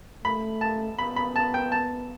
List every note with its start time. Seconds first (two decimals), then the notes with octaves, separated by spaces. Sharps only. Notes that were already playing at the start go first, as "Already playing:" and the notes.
0.25 A3 B5
0.61 A5
0.99 B3 B5
1.16 B5
1.36 A5
1.54 G5
1.72 A5